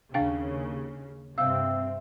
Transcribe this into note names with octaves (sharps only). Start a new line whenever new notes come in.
D#2 C#3 D4 F5 G5
G2 C3 C4 E5 F5 G5 E6